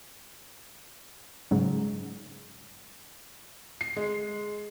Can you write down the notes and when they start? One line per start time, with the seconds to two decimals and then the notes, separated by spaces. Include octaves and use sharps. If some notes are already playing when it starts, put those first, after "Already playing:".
1.51 G#2 C#3 F#3
3.81 C7
3.97 G#3